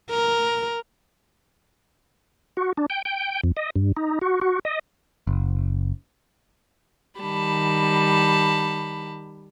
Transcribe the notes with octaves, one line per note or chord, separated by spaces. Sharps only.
A#4
F#4
D4
G5
G5
F2
D#5
G2
D#4
F#4
F#4
D#5
F#1
D#3 G3 A5 B5